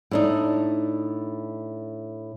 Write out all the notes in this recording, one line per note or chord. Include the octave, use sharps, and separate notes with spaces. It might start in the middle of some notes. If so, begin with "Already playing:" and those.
A2 D4 D#4